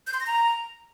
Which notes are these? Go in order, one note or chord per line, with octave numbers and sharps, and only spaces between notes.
G6
C6
A#6
A#5